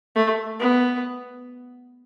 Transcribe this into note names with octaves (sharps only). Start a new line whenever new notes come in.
A3
B3